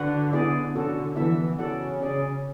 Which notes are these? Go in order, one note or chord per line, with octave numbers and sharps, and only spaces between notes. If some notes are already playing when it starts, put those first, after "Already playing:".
Already playing: D3 F#4 B4 F#5
B3 E4 G#4 D5
D3 C#4 F#4 A4
E3 B3 E4 A4 E5
C#3 F#4 A4 D5 F#5
C#4 G#4 D5